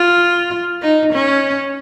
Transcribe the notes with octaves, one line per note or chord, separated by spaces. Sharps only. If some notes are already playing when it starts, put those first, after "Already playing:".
Already playing: F4
D#4
C#4